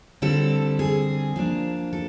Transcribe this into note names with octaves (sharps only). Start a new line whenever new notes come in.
D3 G3 C4 A4
G#4
F3 A#3 D4
A4